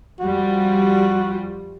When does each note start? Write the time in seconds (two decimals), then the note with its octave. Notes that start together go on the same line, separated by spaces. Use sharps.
0.20 F2 G3 F4 F#4